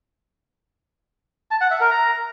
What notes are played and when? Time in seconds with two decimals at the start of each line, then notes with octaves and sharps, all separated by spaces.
1.51 A5
1.61 F#5
1.71 E5
1.81 A#4
1.90 A#5